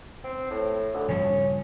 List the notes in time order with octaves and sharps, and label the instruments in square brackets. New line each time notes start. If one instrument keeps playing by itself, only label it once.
[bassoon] C4
A2
D2
[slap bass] G2 C#3 F3 [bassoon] C#4